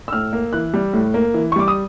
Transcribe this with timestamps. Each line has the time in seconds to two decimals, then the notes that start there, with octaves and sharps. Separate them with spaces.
0.08 E6
0.13 A2 F6
0.33 A#3
0.53 E3 F#6
0.74 G3
0.93 A2
1.14 A#3
1.34 E3
1.52 C#6
1.56 G3 D6
1.68 D#6